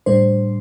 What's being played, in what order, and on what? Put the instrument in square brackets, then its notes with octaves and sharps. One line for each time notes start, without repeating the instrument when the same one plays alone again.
[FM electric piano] A2 G3 D4 C5